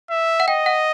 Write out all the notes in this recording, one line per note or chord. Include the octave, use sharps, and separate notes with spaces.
E5
F#5
D#5 G5
F#5